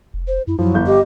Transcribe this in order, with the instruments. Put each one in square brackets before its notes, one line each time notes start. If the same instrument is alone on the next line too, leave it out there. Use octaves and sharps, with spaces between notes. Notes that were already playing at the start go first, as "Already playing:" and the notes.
[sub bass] F1
[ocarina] C5
[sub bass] F#2 [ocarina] E4
[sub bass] F#2 [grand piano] F3 [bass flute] F#3 [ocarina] E4
[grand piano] G1 G6
[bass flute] G4 [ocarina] D#5